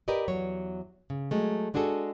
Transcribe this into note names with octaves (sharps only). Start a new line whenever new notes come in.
G4 A#4 B4 D5 D#5
E2 F#3 C#5
C#3
F#3 G#3 A3
G#3 D4 F#4 G#4 A4